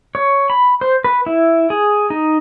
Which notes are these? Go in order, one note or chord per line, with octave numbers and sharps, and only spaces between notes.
C#5
B5
C5
B4
E4
G#4
D#4